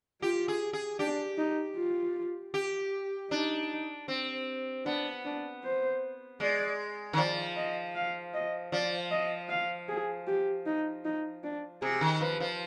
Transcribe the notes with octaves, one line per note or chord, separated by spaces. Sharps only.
F4 G4
G#4
G#4
D4 G4
D#4
F4
G4
D4 D#4
C4
B3 D4
D4
C5
G#3 D5
D#3
F3 D5
D#5
F5
D#5
F3 D5
D#5
F5
G#4
G4
D#4
D#4
D4
C3 G#4
D#3
F3 B4
F3